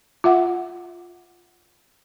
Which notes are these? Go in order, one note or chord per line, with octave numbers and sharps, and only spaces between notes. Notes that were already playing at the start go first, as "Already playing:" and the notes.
F4 E5 F#5